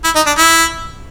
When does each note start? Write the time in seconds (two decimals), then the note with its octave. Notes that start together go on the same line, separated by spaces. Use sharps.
0.04 E4
0.16 D#4
0.26 D4
0.38 E4